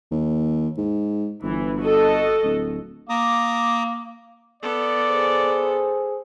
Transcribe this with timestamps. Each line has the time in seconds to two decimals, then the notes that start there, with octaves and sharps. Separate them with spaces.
0.11 D#2
0.78 G#2
1.43 G1 E3
1.82 F#4 A4 D#5
2.44 D1
3.09 A#3 A#5 D6 D#6
4.63 B3 A4 D5
5.08 G#4 C5